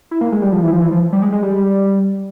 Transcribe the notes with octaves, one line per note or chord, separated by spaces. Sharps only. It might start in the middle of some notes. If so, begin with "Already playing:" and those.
E4
A#3
G#3
G3
F3
E3
F3
E3
F3
G3
G#3
G#3
G3